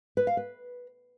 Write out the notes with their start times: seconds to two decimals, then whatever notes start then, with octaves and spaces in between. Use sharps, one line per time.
0.17 B4
0.27 F5
0.37 B4